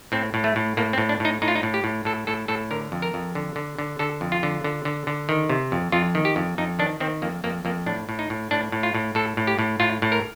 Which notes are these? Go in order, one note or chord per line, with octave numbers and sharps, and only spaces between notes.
A2 C4
A2
A3
A2
A2 A#3
C4
A2
D4
A2 D#4
A2 D#4
F4
D#4
A2
G4
A2
A2 A4
A2 A4
A2 A4
D3 A#4
F2
A#4
F2
D3
D3
D3
D3 A4
F2
F4
D3
D3
D3
D3
D#3
C3
F2
F2 F4
D#3
G4
F2
F2 D#4
D#3 D4
D#3 C4
F2 A#3
F2 A#3
F2 A#3
A2 D4
A2
D#4
A2
A2 D4
A2
F4
A2
A2 A4
A2
G4
A2
A2 F4
A2
A#4